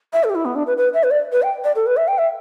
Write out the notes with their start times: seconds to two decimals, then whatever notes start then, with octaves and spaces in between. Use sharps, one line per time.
0.13 E5
0.24 A4
0.30 G4
0.35 E4
0.45 B3
0.55 D4
0.67 B4
0.77 B4
0.94 E5
1.03 B4
1.11 D5
1.32 B4
1.42 G5
1.64 D5
1.76 A4
1.86 B4
1.97 E5
2.08 G5
2.18 E5